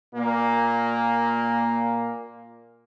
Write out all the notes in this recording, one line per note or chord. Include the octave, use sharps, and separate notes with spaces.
A#2 A#3